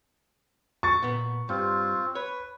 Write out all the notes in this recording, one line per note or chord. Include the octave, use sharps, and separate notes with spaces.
C#6 A6
A#2 B3
G2 C4 F4
B4 C#5